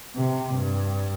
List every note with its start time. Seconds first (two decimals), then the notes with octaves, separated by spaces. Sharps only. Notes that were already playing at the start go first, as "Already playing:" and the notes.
0.16 C3
0.54 G2